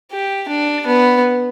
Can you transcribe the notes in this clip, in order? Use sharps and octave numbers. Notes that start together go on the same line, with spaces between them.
G4
D4
B3